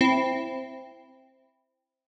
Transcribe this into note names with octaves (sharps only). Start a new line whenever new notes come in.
C4 E4